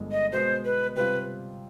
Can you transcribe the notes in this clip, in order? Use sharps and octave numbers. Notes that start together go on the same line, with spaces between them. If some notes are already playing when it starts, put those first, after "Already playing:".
Already playing: G1 G2 F3 G#3
D#5
B2 G#3 B3 C5
B4
C3 G3 C4 F4 B4